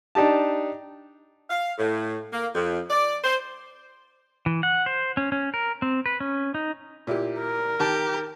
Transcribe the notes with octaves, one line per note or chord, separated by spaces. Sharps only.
D4 D#4 G4 A5
F5
A2
A#3
F2
D5
C5
E3
F#5
C5
C#4
C#4
A#4
C4
B4
C#4
D#4
A#2 E4 G4
A#4
D#3 G4 A5